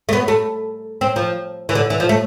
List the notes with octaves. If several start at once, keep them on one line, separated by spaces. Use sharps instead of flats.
A3
B3
A3
C4
F3
E3
D3
E3
F3
A3